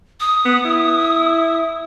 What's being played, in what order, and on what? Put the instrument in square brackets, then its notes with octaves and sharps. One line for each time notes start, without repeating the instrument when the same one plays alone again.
[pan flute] D#6
[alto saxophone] B3
E4